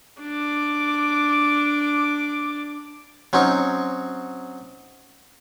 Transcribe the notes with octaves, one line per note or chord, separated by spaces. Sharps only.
D4 D6
F#3 C4 C#4 D#4